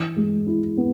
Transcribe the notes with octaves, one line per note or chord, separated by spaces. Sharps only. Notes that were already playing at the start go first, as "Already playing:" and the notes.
Already playing: E3
G#3
E4
B3